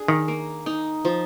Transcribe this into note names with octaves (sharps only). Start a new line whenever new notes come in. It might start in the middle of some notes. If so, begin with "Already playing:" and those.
Already playing: D4 G#4
D#3
A#3
D#4
F3